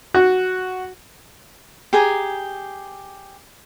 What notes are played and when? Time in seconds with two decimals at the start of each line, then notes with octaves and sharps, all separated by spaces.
0.14 F#4
1.93 G4 G#4 G#5 A#5